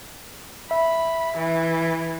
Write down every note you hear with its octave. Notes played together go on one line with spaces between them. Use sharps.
E5 B5
E3